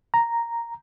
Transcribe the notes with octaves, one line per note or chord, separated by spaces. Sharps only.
A#5